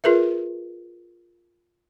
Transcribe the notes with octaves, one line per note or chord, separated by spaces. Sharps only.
F4 G#4 A#4 B4 E5